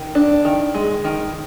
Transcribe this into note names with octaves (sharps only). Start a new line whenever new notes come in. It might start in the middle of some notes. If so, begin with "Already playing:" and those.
Already playing: D#3
D4
D#3
G#3
D#3